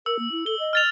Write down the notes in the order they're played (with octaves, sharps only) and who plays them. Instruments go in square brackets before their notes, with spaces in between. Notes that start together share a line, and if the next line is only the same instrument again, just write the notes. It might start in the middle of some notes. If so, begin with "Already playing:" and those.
[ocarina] A#4 [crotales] E6
[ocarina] A#3
E4
[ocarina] A4 [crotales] G7
[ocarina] D#5
[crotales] F6 A6 F7